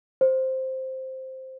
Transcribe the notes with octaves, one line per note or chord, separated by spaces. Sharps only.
C5